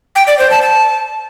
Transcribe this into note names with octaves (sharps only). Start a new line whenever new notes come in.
G5
D5
C5
A5
A5